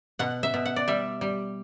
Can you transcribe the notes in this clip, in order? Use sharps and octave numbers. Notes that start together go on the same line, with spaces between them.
B2 F#5
E5
B2
F#5
D5
G3 E5
G3